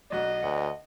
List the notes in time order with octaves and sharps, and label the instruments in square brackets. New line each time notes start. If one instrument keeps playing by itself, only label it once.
[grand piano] B1 D4 F#4 [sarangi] D#5
[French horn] D2 [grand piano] F#5